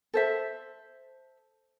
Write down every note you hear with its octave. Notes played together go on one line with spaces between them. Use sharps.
A4 C5 E5